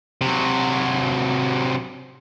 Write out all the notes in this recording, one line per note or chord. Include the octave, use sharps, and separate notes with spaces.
C3 F#3